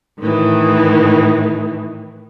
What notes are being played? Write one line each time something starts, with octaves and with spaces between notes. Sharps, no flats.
A2 D#3 E3